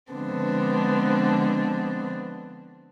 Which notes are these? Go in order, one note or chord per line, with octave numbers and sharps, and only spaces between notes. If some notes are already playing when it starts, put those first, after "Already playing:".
D3 F3 G#3 B3 C4 D4